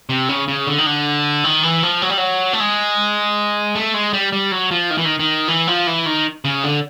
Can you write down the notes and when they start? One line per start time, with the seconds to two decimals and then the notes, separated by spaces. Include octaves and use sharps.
0.10 C3
0.29 C#3
0.48 C#3
0.67 D3
0.78 D#3
0.86 D3
1.44 D#3
1.63 E3
1.83 F3
2.02 F#3
2.10 G3
2.18 F#3
2.53 A3
2.60 G#3
3.75 A3
3.94 G#3
4.13 G3
4.32 G3
4.52 F#3
4.71 F3
4.90 D#3
4.98 E3
5.05 D#3
5.19 D#3
5.48 E3
5.67 F3
5.87 E3
6.06 D#3
6.45 C#3
6.64 D3